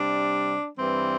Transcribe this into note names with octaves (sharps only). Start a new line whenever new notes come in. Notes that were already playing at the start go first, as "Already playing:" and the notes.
Already playing: C3 G3 D4
G2 E3 G3 C4